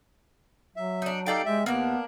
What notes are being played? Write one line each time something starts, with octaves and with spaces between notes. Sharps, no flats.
F#3 E5
D4 D#4
D#4 G4 A4 D5 F5 G5
G#3 E5
D#2 A#3 B3 D4